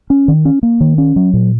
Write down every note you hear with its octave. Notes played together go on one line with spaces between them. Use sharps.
C#4
D#3
C#4
A#3
D#3
C#4
F#3
A#2